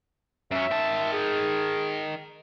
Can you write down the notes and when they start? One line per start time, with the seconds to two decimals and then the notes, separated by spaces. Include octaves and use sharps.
0.51 F#2 C#4 E5
0.71 D#3 A5
1.13 G#4